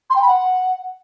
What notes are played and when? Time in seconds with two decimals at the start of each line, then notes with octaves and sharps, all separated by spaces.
0.10 C6
0.16 G5
0.22 B5
0.28 F#5